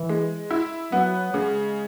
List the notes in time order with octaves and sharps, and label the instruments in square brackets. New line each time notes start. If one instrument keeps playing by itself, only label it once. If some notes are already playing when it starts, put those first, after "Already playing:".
Already playing: [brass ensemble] E3
[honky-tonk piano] G#3
E4
[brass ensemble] F#3 [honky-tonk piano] B3
[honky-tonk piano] C#3 [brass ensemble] G#3